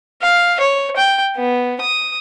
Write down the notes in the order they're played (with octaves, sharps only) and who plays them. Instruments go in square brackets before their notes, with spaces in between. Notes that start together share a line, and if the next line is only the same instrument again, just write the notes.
[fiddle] F5
C#5
G5
B3
D#6